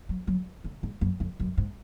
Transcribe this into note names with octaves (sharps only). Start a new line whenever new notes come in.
F#3
F#3
D3
G#2
F#2
F2
F#2
G#2